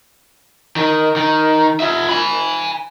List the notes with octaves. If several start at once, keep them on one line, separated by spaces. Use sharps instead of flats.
D#3
D#3
F4 E5
G#5 B5